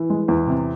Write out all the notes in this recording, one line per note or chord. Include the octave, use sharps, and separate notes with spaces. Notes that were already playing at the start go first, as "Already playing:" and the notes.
Already playing: E3
G#3
E2
C3